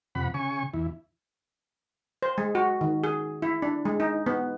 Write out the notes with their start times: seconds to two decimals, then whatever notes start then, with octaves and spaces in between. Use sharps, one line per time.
0.15 F2 C3 F#5 B5
0.34 C#3 G#5 C#6
0.74 E2 E4
2.22 C5
2.38 G#3
2.55 F#4
2.81 D#3
3.04 G#4
3.42 E4
3.62 D4
3.85 G#3
4.00 D#4
4.26 B3